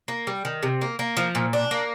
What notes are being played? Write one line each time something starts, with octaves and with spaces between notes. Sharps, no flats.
A#3
G3
D#3
C3
A#3
A#3
F3
A#2
D4
A#3